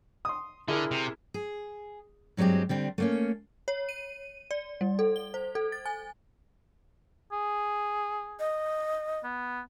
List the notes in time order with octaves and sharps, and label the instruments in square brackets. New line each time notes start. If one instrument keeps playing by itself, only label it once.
[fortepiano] C6 D#6
[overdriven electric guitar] D3 [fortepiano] E4 G#4 A#4
[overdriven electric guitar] C3
[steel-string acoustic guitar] G#4
G2 F#3 G#3 C4 G4
D3 G3 C4
A3 A#3 C#4
[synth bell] C#5
D#7
D5
G3
A4
G7
C5
A4
A6
G#5
[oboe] G#4
[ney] D#5
[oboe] B3